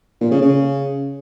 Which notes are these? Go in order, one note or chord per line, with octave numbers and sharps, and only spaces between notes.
A#2
C#3
C#3